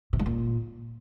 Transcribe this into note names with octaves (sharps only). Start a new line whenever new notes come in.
C3
G#2
A#2